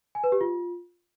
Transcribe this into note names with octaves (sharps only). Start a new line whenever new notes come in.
G#5
B4
G4
F4